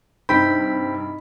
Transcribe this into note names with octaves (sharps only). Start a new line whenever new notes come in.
G2 C3 D#4 E4 C5 G5 B5 B6